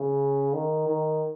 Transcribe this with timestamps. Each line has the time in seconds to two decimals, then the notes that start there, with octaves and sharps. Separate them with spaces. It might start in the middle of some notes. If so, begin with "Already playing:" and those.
Already playing: C#3
0.54 D#3
0.88 D#3